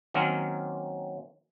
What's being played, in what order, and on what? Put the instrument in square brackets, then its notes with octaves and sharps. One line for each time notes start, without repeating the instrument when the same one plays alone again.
[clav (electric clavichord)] D#3 F#3 A#3 C4 C#4